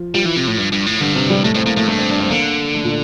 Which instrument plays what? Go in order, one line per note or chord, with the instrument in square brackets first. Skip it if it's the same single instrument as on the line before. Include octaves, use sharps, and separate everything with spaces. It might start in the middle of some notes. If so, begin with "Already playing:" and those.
Already playing: [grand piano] F3
[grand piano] F3 [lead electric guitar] G3
[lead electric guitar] E3
C3
A2
G2
G2
A2
[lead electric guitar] G2 [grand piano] D3
[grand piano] C3
G3
[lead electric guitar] A2 [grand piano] A3
[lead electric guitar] A2 [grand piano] C4
[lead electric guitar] A2 [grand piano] A#3
[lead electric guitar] A2 [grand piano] A3
[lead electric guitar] G2 [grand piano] A3
[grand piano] C4
D4
C4
[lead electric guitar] D3 [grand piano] A#3
[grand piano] A3
A#2